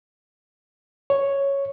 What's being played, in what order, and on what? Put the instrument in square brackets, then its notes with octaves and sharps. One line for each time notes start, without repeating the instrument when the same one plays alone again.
[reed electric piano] C#5